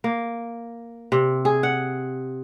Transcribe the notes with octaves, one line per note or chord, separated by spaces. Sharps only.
A#3
C3
G#4
F#5